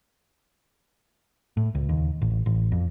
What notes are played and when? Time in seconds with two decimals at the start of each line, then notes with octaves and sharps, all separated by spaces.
1.57 A2
1.75 C#2
1.89 D#2
2.22 A1
2.46 A1
2.72 F2